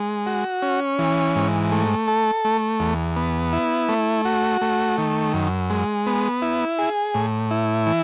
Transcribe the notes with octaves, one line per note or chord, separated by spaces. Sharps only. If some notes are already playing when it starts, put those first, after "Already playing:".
Already playing: G#3
F#4
C#4
E3
G#2
A3
A4
A3
E2
B3
E4
A3
F#4
A3
D#3
F#2
G#3
B3
E4
G#4
A2
E4
E3